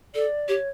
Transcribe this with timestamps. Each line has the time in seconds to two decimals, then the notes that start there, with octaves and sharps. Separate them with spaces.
0.15 A4 D5
0.48 G4 C#5